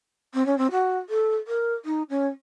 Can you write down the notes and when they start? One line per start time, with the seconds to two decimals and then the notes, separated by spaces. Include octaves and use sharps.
0.34 C4
0.46 C#4
0.58 C4
0.71 F#4
1.09 A4
1.47 A#4
1.85 D#4
2.10 C#4